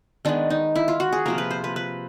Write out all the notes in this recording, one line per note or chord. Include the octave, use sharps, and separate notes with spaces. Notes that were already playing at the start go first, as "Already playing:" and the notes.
D#3 G#3 B3 D4
D#4
E4
F4
F#4
G#4
C3 F3 A#3 A#4
B4
C5
B4
B4